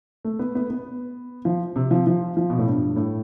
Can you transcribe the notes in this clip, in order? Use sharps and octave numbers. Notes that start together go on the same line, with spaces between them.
A3
B3
B3
B3
F3
C3
F3
F3
F3
B2
A2
G2
A2